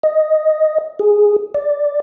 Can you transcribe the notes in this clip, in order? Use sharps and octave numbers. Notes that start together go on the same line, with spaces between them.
D#5
G#4
D5